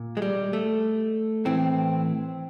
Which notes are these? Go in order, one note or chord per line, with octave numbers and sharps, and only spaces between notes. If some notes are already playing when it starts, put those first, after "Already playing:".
Already playing: A#2
G#3
G3
A3
A2 E3 C4